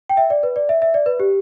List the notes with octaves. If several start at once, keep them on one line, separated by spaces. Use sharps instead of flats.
G5
E5
D5
B4
D5
E5
E5
D5
B4
G4